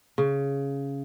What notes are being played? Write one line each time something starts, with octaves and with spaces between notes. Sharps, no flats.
C#3